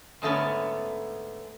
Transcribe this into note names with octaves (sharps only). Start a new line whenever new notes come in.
G#2 D3 A3 B3 C#4